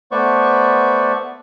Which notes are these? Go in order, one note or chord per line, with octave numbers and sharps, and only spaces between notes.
A3 B3 B4 C5 D5 C#6